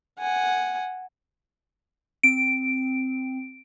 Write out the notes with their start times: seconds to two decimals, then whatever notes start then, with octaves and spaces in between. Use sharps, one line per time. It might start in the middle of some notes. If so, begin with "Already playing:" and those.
0.19 F#5 G#5
2.23 C4 D7